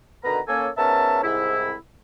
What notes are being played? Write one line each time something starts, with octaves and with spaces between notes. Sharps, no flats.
B2 D3 D#3 B3 B4 A#5
A#3 C#4 A4 G#5
G#2 B3 C#4 A#4 E5 A5
C2 G#2 E4